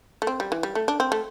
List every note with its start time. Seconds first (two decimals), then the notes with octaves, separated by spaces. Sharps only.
0.22 A3
0.27 C4
0.40 G3
0.52 E3
0.63 G3
0.75 A3
0.88 D4
1.00 C4
1.12 A3